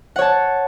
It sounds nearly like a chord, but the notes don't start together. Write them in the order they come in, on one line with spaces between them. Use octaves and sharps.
F#5 C#5 A5